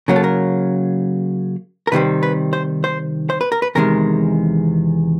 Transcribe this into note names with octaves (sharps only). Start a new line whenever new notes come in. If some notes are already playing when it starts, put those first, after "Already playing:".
C#3 F#3 A#3 A#4
A4
A#4
A#4
C3 D#3 G3 C4 B4
B4
C5
C5
C5
B4
A#4
B4
E2 C3 D#3 G#3 A#4